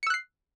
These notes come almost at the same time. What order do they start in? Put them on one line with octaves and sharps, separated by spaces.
C#7 E6 F#6 C7